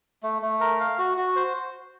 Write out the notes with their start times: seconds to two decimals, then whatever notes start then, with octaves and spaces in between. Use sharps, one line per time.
0.23 A3
0.42 A3
0.61 A#4
0.80 F5
0.98 F#4
1.18 F#4
1.36 C5